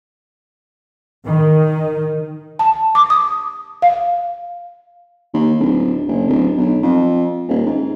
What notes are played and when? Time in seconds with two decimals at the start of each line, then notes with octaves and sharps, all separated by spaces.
1.26 D#3
2.59 A5
2.95 D6
3.10 D#6
3.82 F5
5.34 D#2
5.60 D1
6.08 F#1
6.28 D1
6.57 B1
6.83 F2
7.48 D#1
7.66 G#2